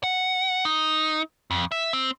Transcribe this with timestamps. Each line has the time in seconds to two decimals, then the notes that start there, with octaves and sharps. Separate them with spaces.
0.04 F#5
0.65 D#4
1.51 F2
1.72 E5
1.93 C4